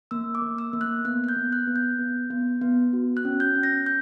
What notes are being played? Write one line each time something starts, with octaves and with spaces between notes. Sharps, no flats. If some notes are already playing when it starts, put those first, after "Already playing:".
A#3 E6
D6
A#3
E6
A#3
F#6
B3 F#6
F#6
G6
B3
F#6
B3
G6
B3
B3
B3
F#4
F#6
C#4
G6
C#4
A#6
G6